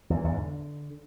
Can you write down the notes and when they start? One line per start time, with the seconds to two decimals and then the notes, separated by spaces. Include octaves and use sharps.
0.10 E2
0.17 E3
0.24 E2
0.31 G#2
0.39 D3